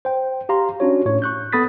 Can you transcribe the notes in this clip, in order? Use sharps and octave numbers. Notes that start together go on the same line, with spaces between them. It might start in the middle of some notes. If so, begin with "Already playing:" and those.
C5 G5
G4 F5 A#5 C6
C#4 D4 F#4 C#5
A2 C#5
C#6 F#6 G6
B3 A4 B5 D#6 A6 B6